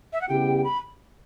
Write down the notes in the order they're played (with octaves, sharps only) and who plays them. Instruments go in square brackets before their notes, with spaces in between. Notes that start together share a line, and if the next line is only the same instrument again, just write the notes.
[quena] E5
F#5
[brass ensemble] C#3 G3 B3 E4 G4 [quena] G5
[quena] B5